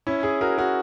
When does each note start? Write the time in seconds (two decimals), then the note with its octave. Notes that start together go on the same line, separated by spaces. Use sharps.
0.07 C#4 E4
0.23 E4 G#4
0.41 F#4 A#4
0.58 F#4 A#4